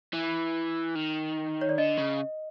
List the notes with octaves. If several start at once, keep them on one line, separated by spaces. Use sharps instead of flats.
E3
D#3
C#5
D5
D3 D#5
C#3